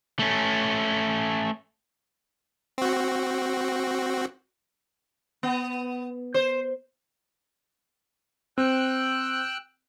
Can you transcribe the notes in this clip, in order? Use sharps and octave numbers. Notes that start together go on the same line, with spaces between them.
A3 C#4
C4 F#4
B3
C5
C4 G5 E6 F#6